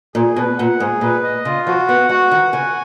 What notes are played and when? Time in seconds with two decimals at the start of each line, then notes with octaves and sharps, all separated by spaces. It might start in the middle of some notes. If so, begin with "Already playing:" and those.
0.15 A#2 G#4
0.36 B2 B4
0.58 A#2 F#5
0.80 G#2 G#4
1.01 A#2 B4
1.23 D#5
1.45 C#3 F4
1.67 F3 F#4
1.89 B3 F#5
2.09 G#3 F#4
2.31 D#3 F#5
2.53 C#3 G#5